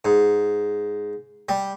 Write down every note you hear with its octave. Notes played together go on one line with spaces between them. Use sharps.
G#2
G3